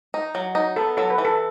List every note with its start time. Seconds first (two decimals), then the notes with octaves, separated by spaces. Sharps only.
0.14 D#4
0.35 F#3
0.55 D#4
0.76 B3 A4
0.97 F#3 A4
1.10 B4
1.18 E3
1.25 A4